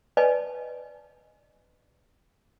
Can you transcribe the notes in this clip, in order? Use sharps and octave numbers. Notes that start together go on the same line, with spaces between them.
B4 D5 D#5 G#5 A5